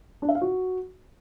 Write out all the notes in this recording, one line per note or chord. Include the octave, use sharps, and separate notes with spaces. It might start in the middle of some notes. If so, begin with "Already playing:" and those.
D4
E5
F5
F#4